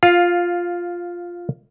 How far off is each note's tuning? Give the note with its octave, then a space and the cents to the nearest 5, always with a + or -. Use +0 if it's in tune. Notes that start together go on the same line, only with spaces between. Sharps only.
F4 +0 F5 +15